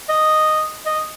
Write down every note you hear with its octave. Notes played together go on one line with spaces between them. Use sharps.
D#5
D#5